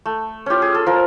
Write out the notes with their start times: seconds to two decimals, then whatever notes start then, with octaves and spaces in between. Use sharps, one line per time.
0.06 A3
0.46 C#4 F4 G4
0.62 G#4
0.75 A4
0.86 F3 A#4